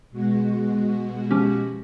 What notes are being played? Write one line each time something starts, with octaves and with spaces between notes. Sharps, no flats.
B2 G#3 F#4
F3 C#4 G4